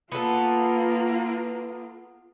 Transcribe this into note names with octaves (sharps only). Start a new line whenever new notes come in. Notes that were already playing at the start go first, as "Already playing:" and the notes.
A#3 B3 F4 A4